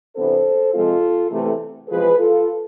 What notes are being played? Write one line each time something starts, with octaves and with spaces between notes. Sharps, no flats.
C3 E3 B3 D4 A4 C5
C3 F3 G#3 C4 F4 A4
E2 C3 E3 A3
E2 C3 F3 G#3 G#4 B4
F4 A4